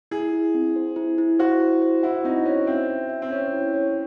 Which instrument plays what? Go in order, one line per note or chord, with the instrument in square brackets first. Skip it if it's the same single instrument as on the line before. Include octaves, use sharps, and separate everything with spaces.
[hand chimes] E4 [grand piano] G#4
[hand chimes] E4
C4
C5
E4
E4
[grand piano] F#4 [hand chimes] C5
[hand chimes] E4
C5
[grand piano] E4 [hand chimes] F#5
[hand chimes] C4 [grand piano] D#4
[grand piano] C#4 [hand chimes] C5
[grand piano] C4 [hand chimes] E5
[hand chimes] E5
E5
[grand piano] C4
[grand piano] C#4 [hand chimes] C#5
[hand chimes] E4
C#5